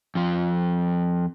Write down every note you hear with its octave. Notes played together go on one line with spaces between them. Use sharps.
F2 F3